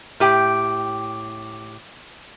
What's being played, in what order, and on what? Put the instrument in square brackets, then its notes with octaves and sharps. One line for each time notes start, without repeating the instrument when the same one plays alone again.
[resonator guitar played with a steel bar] A2 G4 G5